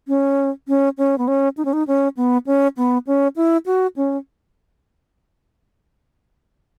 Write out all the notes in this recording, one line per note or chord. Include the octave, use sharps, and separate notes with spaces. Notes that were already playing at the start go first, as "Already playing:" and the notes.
C#4
C#4
C#4
B3
C#4
D#4
C#4
D#4
C#4
B3
C#4
B3
C#4
E4
F#4
C#4